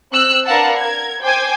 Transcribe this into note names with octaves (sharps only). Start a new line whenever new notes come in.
C4 E6 F#6
D4 A#4 B4 F5 F#5 A5
A#4 G#6
C5 G5 G#5 D6 G#6